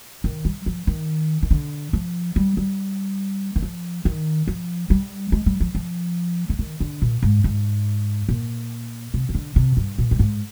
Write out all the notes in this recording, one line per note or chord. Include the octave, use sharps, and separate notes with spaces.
D#3
G3
F3
D#3
D#3
D3
F3
G3
G3
D#3
F3
D#3
F3
G3
G#3
G3
F3
F3
D3
D#3
D3
A#2
G#2
G#2
A#2
C3
C3
D3
C3
G2
A#2
G2
G#2